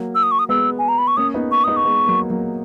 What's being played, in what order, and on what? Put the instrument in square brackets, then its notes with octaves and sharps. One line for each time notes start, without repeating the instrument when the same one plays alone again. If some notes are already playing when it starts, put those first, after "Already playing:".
Already playing: [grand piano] F#3 A#3
[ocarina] E6
D#6
C#6
D#6
[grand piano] G#3 B3 [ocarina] E6
[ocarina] G#5
A#5
B5
C#6
[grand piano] A#3 C#4 [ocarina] D#6
[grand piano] B3 D#4
[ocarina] C#6
[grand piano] B3 D#4 [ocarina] D#6
[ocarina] C#6
[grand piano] G#3 B3
F#3 A#3
F#3 A#3